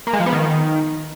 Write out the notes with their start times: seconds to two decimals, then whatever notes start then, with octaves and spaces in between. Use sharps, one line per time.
0.07 A#3
0.13 G#3
0.20 F3
0.26 B3
0.33 D#3